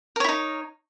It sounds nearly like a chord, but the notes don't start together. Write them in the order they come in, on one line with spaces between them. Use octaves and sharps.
A#4 C#5 E4 D#4